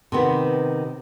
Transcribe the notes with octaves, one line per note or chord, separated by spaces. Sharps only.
C3 D#3 B3